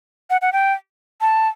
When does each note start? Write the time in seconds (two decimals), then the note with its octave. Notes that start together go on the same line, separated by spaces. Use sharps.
0.30 F#5
0.42 F#5
0.53 G5
1.21 A5